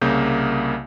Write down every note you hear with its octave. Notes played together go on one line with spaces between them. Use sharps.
C2 C#3 A#3 G6